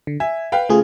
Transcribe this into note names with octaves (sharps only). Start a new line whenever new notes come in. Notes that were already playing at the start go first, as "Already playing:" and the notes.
D3
E5 G#5
B4 F5 G5
C#3 A3 F4 G#4